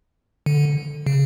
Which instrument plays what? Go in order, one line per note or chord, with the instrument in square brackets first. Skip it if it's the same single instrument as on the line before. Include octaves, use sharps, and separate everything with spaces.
[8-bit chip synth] D3
C#3